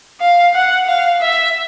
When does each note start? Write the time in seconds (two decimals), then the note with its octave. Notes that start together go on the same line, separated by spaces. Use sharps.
0.20 F5
0.54 F#5
0.87 F5
1.21 E5